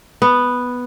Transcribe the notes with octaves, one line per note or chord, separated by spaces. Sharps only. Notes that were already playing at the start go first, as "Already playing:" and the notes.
B3